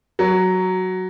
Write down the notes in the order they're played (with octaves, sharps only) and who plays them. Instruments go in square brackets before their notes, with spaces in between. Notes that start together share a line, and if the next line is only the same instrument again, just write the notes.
[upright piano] F#3